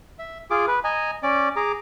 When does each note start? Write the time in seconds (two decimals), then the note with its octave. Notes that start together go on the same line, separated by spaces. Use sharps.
0.19 E5
0.50 F4 G#4 D6
0.68 B4
0.84 D#5 G#5 A#5
1.23 C#4 D5 D6
1.56 G#4 A#5 D6